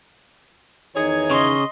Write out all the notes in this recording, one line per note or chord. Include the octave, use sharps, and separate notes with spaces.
E2 D#3 E3 D#4 G#4 C#5
C#3 D#5 C6